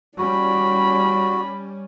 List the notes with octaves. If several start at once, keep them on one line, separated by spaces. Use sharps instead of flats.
G3 C#4 F#4 D5 B5